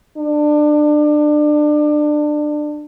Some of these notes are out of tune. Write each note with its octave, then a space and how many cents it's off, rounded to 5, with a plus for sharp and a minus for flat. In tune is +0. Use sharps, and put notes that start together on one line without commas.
D4 +25